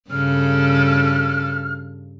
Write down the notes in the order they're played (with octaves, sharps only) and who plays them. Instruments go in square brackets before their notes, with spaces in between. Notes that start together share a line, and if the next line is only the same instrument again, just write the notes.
[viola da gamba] G2 C#3 A4 [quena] F6